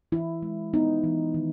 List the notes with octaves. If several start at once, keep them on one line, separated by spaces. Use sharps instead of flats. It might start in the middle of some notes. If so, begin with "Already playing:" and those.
E3 E4
G#3
B3 D#4
E3
D#3